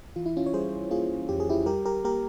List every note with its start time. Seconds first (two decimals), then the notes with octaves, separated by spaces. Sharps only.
0.16 E3 F4
0.26 E4
0.37 C#4 F4
0.46 C#5
0.53 G3 G#4 C5
0.91 A#3 F4 G#4
1.29 F2 G4
1.40 G#4
1.49 E4 G4
1.66 G3 G4 A#4
1.85 G4 A#4
2.04 A#3 G4 A#4